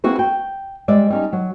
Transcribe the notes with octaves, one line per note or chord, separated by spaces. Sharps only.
A#3 C4 E4 F#4 G#4 B4
G5
G3 G#3 D5 E5
G3 C#4 D#4
F#3